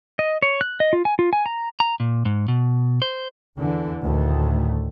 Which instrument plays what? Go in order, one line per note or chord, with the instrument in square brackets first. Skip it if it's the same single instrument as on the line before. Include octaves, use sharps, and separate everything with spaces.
[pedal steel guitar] D#5
C#5
F#6
D#5
F4
G#5
F4
G#5
A#5
[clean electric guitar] A#5
A#2
G#2
B2
C5
[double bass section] E2 D3 E3
D2 A2 D#3 A3